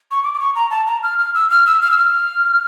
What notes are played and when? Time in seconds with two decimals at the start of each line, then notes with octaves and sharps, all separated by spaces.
0.11 C#6
0.24 D6
0.34 D6
0.40 C#6
0.55 A#5
0.71 A5
0.87 A#5
1.03 F6
1.19 F6
1.35 E6
1.51 F6
1.66 E6
1.82 F6
1.91 E6
1.98 F6